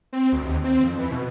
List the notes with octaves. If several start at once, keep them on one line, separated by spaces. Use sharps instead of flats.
C4
D2
D#2
C4
F2
E3
B2